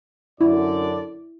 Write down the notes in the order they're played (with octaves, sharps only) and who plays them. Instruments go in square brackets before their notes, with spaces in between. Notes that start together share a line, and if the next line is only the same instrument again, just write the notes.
[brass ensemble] F#2 D3 D5 [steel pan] E4